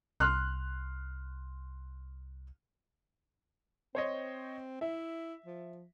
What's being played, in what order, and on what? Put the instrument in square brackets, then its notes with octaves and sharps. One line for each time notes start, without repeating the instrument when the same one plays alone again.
[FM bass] C2 [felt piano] C6 F6 F#6
[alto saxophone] C4 [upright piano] C5 C#5 D#5
[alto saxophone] E4 [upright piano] E5
[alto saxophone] F3